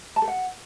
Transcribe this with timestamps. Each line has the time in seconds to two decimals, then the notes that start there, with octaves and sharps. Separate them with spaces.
0.16 A5
0.22 A4
0.28 F#5